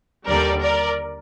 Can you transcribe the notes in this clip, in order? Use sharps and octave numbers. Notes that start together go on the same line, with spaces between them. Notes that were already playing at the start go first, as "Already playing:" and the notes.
D#2 D3 G3 A#4 D5
A#4 D5